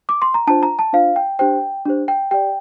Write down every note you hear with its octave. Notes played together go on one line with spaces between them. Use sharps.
D6
C6
A#5
D4 F4 C5 A5
A#5
A5
D4 F4 C5 F5
G5
D4 G4 C5 G5
D4 G4 C5
G5
G4 D5 G5